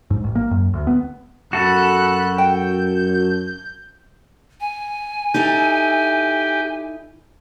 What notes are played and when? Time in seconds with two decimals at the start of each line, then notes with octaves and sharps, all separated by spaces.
0.11 G#2
0.24 A1
0.35 A#3
0.51 F#2
0.74 D2
0.87 B3
1.53 F#2 F#4 A4 B5 F#6
2.38 G5 G6
4.61 G#5
5.34 D#4 E4 G4 A4